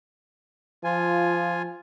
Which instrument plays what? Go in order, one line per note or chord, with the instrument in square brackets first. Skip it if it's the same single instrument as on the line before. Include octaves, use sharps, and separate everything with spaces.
[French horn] F3 [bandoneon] F4 G#5